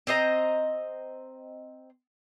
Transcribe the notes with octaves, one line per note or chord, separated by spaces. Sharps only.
C4 C5 D#5 A#5